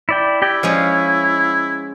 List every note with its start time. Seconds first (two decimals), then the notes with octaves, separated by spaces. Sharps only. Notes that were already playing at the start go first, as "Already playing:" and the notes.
0.09 E4 D5 G5
0.42 E4 G4 D5 G5
0.63 F3 G#3 C#4 F5